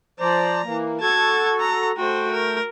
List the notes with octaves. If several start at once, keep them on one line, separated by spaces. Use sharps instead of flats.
F3 C5 D5 A#5
E3 A#3
F#4 A4 A5 G#6
A#5
A3 F#4 C5 G5
A#4